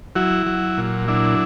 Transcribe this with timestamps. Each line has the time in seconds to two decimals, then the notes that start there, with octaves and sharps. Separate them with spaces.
0.15 F#3 E4 F#4
0.46 F#3
0.77 A#2
1.08 F#3 D4 E4